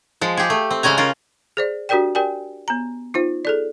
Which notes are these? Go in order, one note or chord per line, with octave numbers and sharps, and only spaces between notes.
F3 G#3
G4 G#4
A3
C4
C#3 G#3 C#4 G#5 A#5
C#4 F4 A#4
G#4 C5 D5
D4 F#4 G4 A#4 D5 G5
G4 A#4 D5 G5 G#5
B3 A#5
D#4 F4 C5
G#4 A4 D5